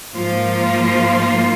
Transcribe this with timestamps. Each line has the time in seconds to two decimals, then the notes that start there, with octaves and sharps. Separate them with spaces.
0.14 G#2 F3 A#3 F4